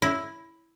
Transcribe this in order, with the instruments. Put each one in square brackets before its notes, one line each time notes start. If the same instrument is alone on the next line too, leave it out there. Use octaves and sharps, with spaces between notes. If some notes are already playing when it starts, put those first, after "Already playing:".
[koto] E4